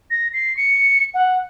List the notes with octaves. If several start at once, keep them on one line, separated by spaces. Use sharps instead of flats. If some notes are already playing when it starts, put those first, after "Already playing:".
A#6
C7
C#7
F#5